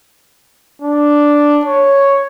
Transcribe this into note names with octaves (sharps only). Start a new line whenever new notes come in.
D4
C#5